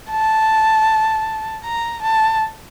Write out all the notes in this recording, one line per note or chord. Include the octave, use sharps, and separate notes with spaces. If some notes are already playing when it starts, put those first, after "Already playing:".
A5
A#5
A5